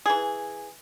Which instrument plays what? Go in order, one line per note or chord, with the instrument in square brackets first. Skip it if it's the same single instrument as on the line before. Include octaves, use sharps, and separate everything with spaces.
[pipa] E3 G#4